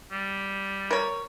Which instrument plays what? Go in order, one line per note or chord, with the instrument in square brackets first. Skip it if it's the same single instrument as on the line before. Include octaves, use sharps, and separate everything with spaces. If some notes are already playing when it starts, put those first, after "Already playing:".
[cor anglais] G3
[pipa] A#4 C#5